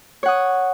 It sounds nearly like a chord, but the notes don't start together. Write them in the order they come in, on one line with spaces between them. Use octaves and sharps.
C#5 F#5 D#6